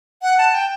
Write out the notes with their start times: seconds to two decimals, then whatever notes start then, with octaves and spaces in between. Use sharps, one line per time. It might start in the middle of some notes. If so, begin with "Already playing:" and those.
0.22 F#5
0.38 A5
0.54 G5